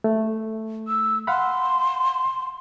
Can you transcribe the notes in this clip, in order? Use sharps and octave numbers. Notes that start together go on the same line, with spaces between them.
A3
E6
F5 F#5 B5 C6